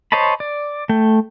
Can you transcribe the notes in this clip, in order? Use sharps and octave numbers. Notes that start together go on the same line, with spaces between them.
C5 C#5 D#5 A5 B5
D5
A3 G5